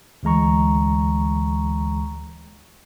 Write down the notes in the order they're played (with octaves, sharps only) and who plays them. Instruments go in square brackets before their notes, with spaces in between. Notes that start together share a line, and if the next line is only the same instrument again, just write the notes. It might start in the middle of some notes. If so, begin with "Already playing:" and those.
[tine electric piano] D2 E3 G#3 A#5 C#6